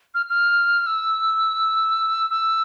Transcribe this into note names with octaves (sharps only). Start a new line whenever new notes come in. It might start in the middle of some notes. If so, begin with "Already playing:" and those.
F6
F6
E6
E6